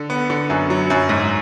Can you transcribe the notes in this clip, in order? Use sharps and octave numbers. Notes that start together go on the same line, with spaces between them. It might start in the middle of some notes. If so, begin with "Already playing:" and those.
Already playing: D3
B3
D3
F#2
F#3
F#2
G#2